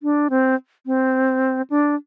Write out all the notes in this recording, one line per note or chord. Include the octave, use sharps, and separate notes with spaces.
D4
C4
C4
D4